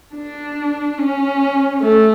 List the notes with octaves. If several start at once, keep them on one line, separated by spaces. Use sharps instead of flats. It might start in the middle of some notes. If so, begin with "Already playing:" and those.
D4
C#4
A3